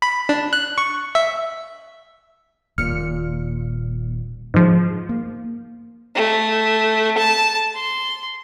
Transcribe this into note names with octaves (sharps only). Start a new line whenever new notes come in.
B5
D4
F#6
C#6
E5
D#1 A#2 F6 C#7
G#2 F3
A#3
A3
A5
C6